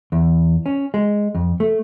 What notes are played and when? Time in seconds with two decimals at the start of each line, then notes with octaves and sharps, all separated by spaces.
0.12 E2
0.66 C#4
0.94 G#3
1.35 F2
1.60 A3